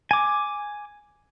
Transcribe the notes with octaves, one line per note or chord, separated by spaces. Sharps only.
G#5 D6